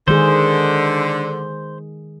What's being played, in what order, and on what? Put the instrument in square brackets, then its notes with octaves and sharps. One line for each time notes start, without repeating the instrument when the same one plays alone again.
[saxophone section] D3 [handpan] D#3 G#3 G#4 [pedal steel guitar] C5